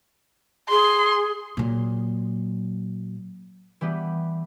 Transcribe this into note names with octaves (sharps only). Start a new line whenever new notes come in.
G#4 C6
A#2 F#3
E3 G3 B3 G4